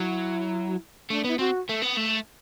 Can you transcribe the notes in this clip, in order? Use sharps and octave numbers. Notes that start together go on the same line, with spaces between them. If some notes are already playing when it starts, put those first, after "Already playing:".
Already playing: F#3 E4
A3 D4
B3 E4
C4 F#4
A3
B3
A3